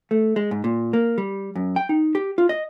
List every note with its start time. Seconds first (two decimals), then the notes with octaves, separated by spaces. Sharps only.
0.11 A3
0.36 G#3
0.51 G#2
0.64 A#2
0.93 A#3
1.18 G3
1.55 F#2
1.76 G5
1.89 D#4
2.15 G4
2.38 F4
2.49 D#5